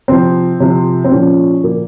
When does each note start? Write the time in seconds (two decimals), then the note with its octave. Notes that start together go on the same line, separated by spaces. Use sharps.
0.08 C3 F3 C4
0.60 C3 F3
1.04 C4
1.11 A#2 F3 C#4
1.64 A#2 F3 A#3